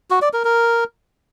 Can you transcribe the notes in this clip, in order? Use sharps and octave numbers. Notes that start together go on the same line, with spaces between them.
F#4
D5
A#4
A#4